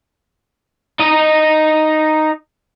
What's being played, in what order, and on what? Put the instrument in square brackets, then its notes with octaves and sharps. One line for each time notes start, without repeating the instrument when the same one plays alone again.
[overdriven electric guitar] D#4 D#5